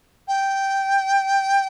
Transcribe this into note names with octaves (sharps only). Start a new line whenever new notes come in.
G5